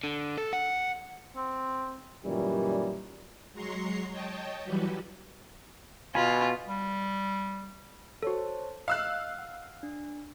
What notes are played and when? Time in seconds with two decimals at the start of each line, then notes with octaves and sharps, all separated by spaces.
0.04 D3
0.38 A4
0.53 F#5
1.36 C4
2.25 F#2 A#2 D#3 E3 G3
3.53 F#3 G#3 A#5 C6 C#6 C7
4.10 C#5 D#5 G5 A5
4.65 E3 F#3 G3 F#4 G4 B4
6.15 B2 F4 G#5 B5
6.66 G3
8.23 F#4 A4 C5 C#5 A5
8.88 D#5 F5 E6 F#6
9.39 F#5
9.83 D4